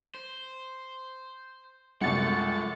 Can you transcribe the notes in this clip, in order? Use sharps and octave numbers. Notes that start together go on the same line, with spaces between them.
C5
C2 F#2 F3 G#3 A3 A6 C#7